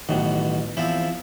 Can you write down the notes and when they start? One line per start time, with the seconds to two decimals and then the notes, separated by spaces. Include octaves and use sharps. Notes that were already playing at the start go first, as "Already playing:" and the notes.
0.09 A1 B2 D#3 F#3
0.77 E2 F3 C4 E4